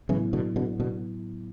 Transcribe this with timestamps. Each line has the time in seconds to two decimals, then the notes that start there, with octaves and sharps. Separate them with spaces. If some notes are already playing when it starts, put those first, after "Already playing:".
0.09 A2 C#3 E3 F#3 B3 E4
0.33 B2 D3
0.56 B2 D3
0.80 B2 D3